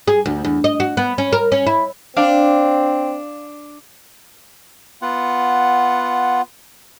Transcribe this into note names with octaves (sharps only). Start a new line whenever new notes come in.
G#4
D2
E2
D#5
F#4
B3
C#4
A#4
C#4
E4
C4 D4 F5 D6
B3 F4 F#5